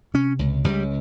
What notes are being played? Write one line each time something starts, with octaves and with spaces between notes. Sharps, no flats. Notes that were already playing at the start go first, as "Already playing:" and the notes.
C3 C#4
C#2
C#2 G3